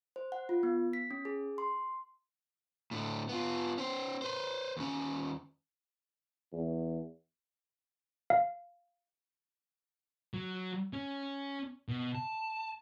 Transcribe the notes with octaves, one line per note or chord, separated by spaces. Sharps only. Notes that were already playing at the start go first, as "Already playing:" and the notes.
C5
F#5
F4
B3
B6
C#4
G#4
C6
A2 D3
B3 F4
C#4 C5
B4 C5
D#2 C#4
E2
F5
F#3
C#4
B2
A5